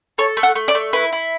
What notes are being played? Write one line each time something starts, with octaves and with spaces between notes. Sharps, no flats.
A4 C#5
A3
F#5
A3
D5
A3
E4 B4
E4